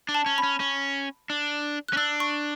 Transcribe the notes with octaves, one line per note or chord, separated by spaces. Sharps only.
D4
A5
C#4
B5
C#4
C#4
D4
C#4 F#6
D4 E6
C#6